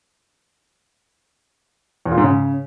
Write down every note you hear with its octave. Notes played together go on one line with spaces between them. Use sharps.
E2
A#2
G#2
C#3